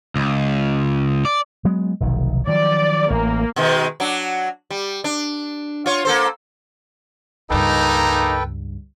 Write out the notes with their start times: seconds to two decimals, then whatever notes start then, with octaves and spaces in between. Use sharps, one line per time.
0.16 C#2
1.25 D5
1.65 F#3 G#3 B3
2.00 F1 B1 D#3
2.47 D#3 F3 F#3 D5
3.10 A1 A#3
3.56 B2 D#3 G#3
4.00 F#3 D4
4.70 G3
5.04 D4
5.86 F4 C#5
6.05 A#3 A4 C5
7.50 C#2 G2 A#3 D#4 A4 B4 G5